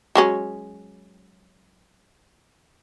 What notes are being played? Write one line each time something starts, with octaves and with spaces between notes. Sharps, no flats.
F#3 G#3 C#4